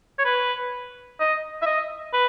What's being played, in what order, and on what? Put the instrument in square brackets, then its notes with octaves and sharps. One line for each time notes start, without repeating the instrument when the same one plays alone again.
[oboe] C#5
B4
D#5
E5
D#5
B4